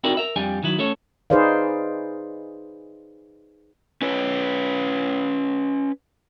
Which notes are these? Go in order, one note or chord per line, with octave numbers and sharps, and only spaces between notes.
C4 D#4 E4 F#4 A#4 D5
A#4 E5
F2 G3 D4 G#5
D#3 F#3 E4
A3 C#4 A4 C#5
D#4 G#4 B4 C5 D5 F5
C#4 B4 C#5